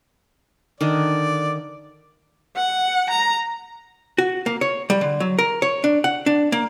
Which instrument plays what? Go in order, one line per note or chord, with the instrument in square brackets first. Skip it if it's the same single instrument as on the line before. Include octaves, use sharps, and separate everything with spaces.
[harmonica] D3 D5 [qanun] D#3 D4
[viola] F#5
A#5
[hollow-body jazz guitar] F#4
A#3
C#5
G3
D3
F#3
A#4
C#5
D4
F#5
D4
A#3